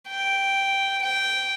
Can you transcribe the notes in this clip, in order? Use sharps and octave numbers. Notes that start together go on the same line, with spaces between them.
G5
G5